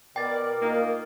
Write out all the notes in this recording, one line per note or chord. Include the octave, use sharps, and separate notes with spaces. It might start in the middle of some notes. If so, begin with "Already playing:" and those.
B2 A#4 D5 G5 A6
A#3 D#4 F4